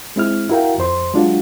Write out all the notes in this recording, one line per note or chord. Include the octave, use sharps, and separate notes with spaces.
G#3 C4 E4 F6
E4 F#4 A#4 F5 G5
F2 C5 C6
F#3 G#3 D4 F4 F#4